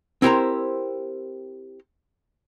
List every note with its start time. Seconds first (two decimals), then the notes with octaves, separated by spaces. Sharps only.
0.22 C4 E4 G4 A#4 C5 A#5